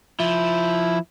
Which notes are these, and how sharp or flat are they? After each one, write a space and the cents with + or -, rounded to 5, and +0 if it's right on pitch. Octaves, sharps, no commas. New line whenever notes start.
F3 +0 E4 +0